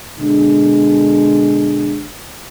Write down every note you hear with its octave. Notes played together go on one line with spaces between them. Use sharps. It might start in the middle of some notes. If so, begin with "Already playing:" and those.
B2 D3 G#3 D4